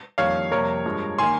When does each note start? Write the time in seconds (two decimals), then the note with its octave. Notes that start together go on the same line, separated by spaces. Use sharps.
0.18 F2 D#3 G3 A#3 C#5 F5
0.51 F2 C3 G3 A#3 A#4 C#5
0.85 G2 F3 G#3
1.18 D#3 A#3 G#5 C6